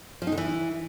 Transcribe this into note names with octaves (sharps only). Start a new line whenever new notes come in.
F3
D#4
D3
E3